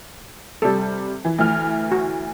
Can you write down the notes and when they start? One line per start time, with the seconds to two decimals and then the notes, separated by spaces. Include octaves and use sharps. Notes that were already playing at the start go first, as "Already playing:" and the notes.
0.62 C3 G3 A4
1.25 E3
1.38 D2 E3 F6
1.91 F#4